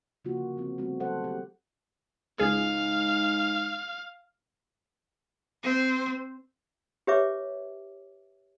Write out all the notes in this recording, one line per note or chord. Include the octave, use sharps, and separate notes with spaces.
C#3 F3 A#3 F4 F#4
D3
D3 F3 C4
G3 A3 B3 C4 F#4
F#3 A3 A4 C5 F#5
D#3 A3 G4
C#2 G#2 G#4 F5
C4 C5
G4 B4 C#5 E5 D6